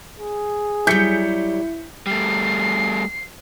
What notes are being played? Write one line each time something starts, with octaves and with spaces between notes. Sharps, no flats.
G#4
F#3 G3 E4 G6 B6 C#7
G3 A3 C7